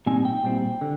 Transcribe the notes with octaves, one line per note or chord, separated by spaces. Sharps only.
A#2 G3 C4 D#4 G#5
G5
A#2 G3 C4 E4
D3